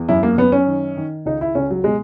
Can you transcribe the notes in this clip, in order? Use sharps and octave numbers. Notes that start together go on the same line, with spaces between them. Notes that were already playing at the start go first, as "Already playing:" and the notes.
Already playing: E2
F#2 E4
A#3
F#2 B3
C#4
D#3
D#3
C#2 D#4
E4
C#2 C#4
F#3
B2 G#3